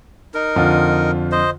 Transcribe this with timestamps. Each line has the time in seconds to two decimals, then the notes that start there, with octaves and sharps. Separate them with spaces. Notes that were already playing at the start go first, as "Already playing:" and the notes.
0.34 D#4 A#4
0.56 F2 D3 F4
1.32 C5 D#5